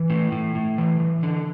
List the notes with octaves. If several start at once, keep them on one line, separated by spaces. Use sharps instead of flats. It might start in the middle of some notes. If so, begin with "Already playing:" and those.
Already playing: E3
A2
A2
A2
E3
E3
D3